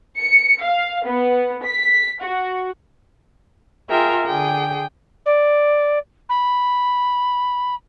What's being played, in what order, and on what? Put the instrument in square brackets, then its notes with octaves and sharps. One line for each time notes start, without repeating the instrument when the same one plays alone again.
[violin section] C#7
F5
B3
B6
F#4
[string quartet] F4 G#4 A#4 E5 G5
D3 G#4 G5
[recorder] D5
B5